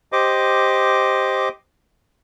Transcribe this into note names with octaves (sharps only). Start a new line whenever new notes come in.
G4 C5 D#5 D6